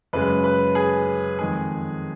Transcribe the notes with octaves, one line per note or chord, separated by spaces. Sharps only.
F#2 C#3 G#3 B4
B4
G#4
F2 D#3 G#3 G#4